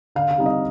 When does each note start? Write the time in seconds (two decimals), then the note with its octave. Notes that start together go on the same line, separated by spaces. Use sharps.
0.15 D3 F5
0.31 F5
0.38 G3 C4 D#4
0.46 D#5